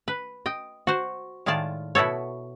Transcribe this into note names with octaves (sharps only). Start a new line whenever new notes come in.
B4
D#5 G5
F#4 C5
A2 D#3 G#3 F4 D5 A5
B2 E4 F#4 A4 C#5